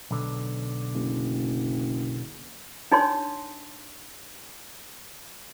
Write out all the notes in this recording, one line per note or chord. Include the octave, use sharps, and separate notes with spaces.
B1 D3
F#1
D4 D#4 C#5 C6